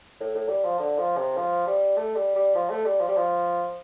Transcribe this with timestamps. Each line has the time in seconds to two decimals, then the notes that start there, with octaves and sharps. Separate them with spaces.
0.20 A2
0.35 A2
0.49 G3
0.64 F3
0.79 D3
0.98 F3
1.17 C3
1.37 F3
1.67 G3
1.97 A3
2.15 G3
2.35 G3
2.55 F3
2.70 A3
2.85 G3
3.00 F3
3.08 G3
3.17 F3